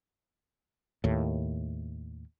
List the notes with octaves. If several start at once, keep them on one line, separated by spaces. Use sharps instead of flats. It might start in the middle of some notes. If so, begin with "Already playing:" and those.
D#2 A2